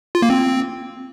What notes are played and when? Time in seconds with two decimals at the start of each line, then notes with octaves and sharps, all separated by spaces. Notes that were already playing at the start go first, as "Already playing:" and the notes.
0.15 F4
0.22 A#3
0.30 C4